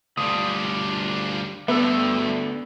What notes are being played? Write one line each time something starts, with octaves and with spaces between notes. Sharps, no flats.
D2 G3 D4 F4 D#6
G2 D3 A3 B3 E5 E6